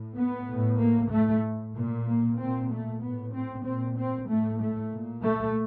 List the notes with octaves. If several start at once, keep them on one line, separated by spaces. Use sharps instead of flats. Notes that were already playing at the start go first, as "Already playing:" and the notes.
Already playing: A2
B3
A2
A#3
A2 A3
A#2
A#3
A#2 C4
A3
A2 B3
C4
A#2 C4
C4
A2 A3
A3
A#2
A3